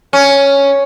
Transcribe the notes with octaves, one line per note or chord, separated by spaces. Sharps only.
C#4